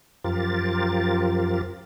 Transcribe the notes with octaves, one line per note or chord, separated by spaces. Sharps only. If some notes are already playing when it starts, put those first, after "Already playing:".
F#2 F3 F4 G4 A#4 A6